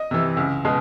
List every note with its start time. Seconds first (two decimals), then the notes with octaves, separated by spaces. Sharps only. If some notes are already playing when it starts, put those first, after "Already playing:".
Already playing: D#5
0.11 C3 E3
0.37 C#2
0.65 B2 G#3